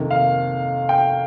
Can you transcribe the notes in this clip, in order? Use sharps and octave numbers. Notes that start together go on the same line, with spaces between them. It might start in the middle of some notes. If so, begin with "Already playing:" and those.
Already playing: F2 C3 D#3 A#3
F5
G5